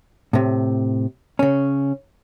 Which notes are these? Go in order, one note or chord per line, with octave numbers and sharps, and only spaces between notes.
A2 C3
C#3 C#4